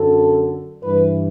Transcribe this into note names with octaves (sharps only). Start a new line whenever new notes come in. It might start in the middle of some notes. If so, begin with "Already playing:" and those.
Already playing: F#2 D3 A4
G2 E3 B4